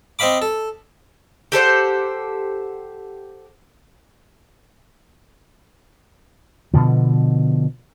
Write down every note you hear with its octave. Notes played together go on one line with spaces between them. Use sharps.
C4 D#5 F5 B5 D6
A4
G4 A4 C5 F#5
B2 D3 F3